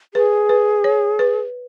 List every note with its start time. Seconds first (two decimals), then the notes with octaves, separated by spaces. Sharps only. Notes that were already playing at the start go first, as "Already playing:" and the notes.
0.14 G#4 B4
0.49 B4
0.84 C#5
1.19 B4